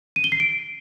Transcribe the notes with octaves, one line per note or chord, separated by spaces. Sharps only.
D#7
G7
C7
D7